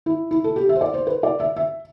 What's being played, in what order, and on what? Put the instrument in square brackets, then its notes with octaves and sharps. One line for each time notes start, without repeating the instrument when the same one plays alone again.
[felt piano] E4
E4
A4
G4
E5
C5
D5
C5
B4
D5
E5
E5